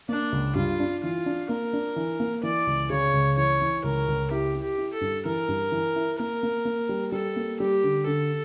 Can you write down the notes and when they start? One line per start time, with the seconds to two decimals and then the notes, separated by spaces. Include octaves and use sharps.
0.09 A#3 D4
0.32 C#2
0.55 G2 F4
0.80 D4
1.03 E3 F4
1.26 D4
1.49 A#3 A#4
1.73 D4
1.96 E3
2.20 A#3
2.43 E3 D5
2.67 C#2
2.90 C#3 C#5
3.13 C#2
3.37 E3 C#5
3.61 E3
3.84 C#2 A#4
4.08 C#2
4.31 E4 G4
4.55 E4
4.62 G4
4.78 E4
4.93 A4
5.01 G2
5.25 E3 A#4
5.48 G2
5.72 E3
5.96 E4
6.19 A#3 A#4
6.43 A#3
6.65 A#3
6.89 G3
7.12 G3 A4
7.36 A#3
7.60 G3 G4
7.84 D3
8.07 D3 A4